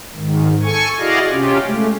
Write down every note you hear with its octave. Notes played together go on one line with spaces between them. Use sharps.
G#2 D#3
A4 G#5 C#6
E4 F#4 G#4 D5 D#5 F5
C3 C#4 F4 G4
G#3 A3